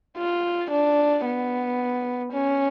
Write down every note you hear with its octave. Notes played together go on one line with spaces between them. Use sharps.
F4
D4
B3
C#4